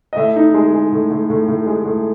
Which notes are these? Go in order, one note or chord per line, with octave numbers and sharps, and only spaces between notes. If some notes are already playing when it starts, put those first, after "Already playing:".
D#5
A2 E5
D#4
G#3
G#3
A2
A2
A2
A2
G#3
A2